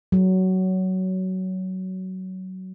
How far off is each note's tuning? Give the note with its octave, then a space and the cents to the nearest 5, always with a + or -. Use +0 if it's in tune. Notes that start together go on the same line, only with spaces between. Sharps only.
F#3 +15